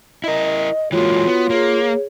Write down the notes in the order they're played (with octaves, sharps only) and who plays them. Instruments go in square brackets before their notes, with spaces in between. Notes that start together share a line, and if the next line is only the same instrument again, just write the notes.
[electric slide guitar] E4 A#4 [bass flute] D#5
[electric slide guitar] E3 G#3 A#3 [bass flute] F4 [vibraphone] F#4 C#5
[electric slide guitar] B3
[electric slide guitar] A#3 [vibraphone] G#4 C#5